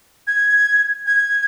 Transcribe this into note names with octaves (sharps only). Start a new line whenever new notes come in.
G#6
G#6